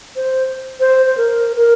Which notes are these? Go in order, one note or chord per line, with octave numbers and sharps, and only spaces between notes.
C5
C5
C5
A#4
A#4